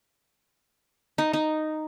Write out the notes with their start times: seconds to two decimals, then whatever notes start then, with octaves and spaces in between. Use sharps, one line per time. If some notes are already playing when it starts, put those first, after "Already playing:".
1.18 D#4
1.33 D#4